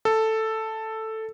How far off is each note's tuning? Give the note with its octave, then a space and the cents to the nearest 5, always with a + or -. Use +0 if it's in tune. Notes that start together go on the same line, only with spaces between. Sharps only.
A4 +5